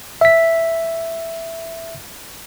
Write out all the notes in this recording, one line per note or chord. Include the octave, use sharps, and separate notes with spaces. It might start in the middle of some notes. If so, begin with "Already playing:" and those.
E5 B6